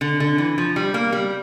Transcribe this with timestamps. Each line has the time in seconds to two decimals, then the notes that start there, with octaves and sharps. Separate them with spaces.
0.01 D3
0.20 D3
0.38 E3
0.58 F3
0.76 G3
0.94 A#3
1.12 G3